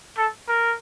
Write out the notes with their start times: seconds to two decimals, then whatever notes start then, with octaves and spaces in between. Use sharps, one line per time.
0.18 A4
0.48 A#4